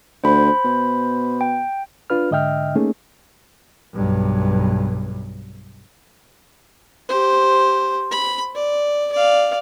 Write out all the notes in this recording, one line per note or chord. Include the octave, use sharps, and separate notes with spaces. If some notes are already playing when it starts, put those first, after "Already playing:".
D2 C5 B5
B2
G5
D4 F4 B4 F6
G#2 D3 D#5 E5 G5 F6
A3 A#3 C#4 D#4 G#4
B1 G2
G4 C5
B5
D5
D5 F5